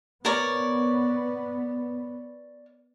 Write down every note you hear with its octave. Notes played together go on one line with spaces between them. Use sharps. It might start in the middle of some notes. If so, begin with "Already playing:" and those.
B3 A#4 C#5 D5